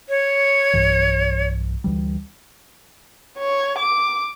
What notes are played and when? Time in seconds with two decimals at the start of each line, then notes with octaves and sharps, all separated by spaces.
0.09 C#5
0.73 B1 G2 E3
1.84 D2 E3 G3
3.38 C#5
3.79 D6